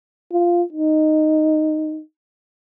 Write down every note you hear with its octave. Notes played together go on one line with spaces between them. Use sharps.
F4
D#4